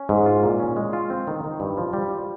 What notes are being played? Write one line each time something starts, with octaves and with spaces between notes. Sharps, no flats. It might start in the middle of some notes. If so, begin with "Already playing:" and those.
Already playing: C#4
G#2
F4
A#2
C#4
G#3
F4
C4
D#3
D#3
G2
F3
G3
F4